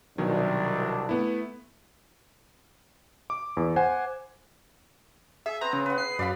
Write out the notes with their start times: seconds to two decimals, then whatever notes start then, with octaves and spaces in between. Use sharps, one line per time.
0.18 C2 B2 D#3 F#3 D4
1.09 A3 B3 E4
3.30 D6
3.57 E2
3.76 C5 F#5 G#5
5.46 G#4 E5
5.61 B3 C4 A#5
5.73 C#3
5.86 B4 F#5
5.98 C7
6.19 F#2 D5 F5 B5